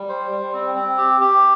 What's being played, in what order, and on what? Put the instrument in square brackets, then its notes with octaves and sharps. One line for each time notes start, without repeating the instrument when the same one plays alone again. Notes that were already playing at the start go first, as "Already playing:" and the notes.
Already playing: [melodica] G3
C5
G3
C4
C4
G4
G4